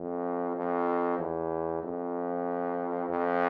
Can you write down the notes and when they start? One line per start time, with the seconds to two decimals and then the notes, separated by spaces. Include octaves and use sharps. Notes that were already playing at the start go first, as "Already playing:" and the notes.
Already playing: F2
0.56 F2
1.19 E2
1.83 F2
3.09 F2